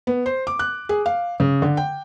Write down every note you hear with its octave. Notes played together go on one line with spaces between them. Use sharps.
B3
C5
D6
F#6
G#4
F5
C#3
D3
G5